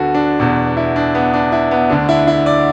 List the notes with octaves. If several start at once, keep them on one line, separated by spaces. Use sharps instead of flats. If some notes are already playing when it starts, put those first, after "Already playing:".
Already playing: D2 D3 B3 F#4 A4
D4
E2 B2 D4
E4
D4
B3
D4
E4
B3
D2 D3 D4
E4
E4
D5